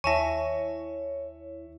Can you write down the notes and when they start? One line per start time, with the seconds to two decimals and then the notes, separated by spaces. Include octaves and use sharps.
0.04 D#2 E4 C#5 E5 G#5 A5 C#6 A#6